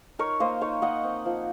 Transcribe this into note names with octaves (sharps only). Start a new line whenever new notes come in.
D#4 A#4 C#5
A#3 C5 D#5
D#4 C#5 F5
A#3 D#5 F#5
C4
F3